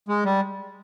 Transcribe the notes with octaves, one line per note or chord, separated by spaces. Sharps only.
G#3
G3